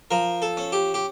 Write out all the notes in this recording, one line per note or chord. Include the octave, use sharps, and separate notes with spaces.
F3 A#4
A4
C#4
G4
G4